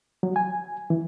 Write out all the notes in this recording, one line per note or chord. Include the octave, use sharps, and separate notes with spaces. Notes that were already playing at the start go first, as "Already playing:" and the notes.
F#3
G#5
E3